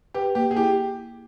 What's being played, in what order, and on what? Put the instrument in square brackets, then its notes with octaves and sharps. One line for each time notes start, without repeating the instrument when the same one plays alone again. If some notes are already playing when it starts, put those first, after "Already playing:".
[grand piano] G4 [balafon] B4
[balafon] A#3 [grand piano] G4
[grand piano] G#4
[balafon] E4 [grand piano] G4